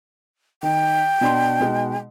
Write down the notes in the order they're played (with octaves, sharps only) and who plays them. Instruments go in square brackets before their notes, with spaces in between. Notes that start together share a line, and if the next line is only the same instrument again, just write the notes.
[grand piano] D#3 [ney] G5
[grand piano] B2 D4 C6
B2 G#3 D#4